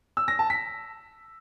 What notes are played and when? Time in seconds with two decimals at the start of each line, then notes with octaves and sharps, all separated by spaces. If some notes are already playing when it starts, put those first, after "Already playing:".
0.17 E6
0.28 A#6
0.39 A5
0.50 B6